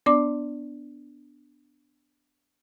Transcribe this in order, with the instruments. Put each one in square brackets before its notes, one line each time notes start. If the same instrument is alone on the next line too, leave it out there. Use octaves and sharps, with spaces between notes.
[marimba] B3 D4 D5 D6